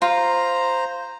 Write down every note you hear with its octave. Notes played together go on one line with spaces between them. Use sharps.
F4 C5 A#5